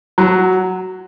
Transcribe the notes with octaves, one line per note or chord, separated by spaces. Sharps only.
F#3